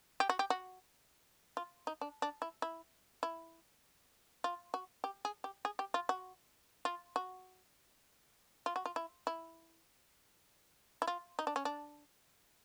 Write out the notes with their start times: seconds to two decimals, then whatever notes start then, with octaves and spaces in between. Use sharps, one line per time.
0.20 G4
0.29 F#4
0.39 G4
0.50 F#4
1.57 F4
1.87 D#4
2.01 D4
2.22 D4
2.42 E4
2.62 E4
3.23 E4
4.44 F4
4.74 F#4
5.04 G4
5.25 G#4
5.44 G4
5.65 G#4
5.79 G4
5.94 F4
6.09 F#4
6.85 F4
7.16 F#4
8.66 F4
8.76 F#4
8.86 F4
8.96 E4
9.27 E4
11.02 E4
11.07 F4
11.39 D#4
11.47 D4
11.56 C#4
11.65 D4